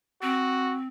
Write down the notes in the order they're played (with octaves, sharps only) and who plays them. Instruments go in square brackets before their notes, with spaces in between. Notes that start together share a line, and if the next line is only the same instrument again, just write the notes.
[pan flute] C4 [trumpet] F#4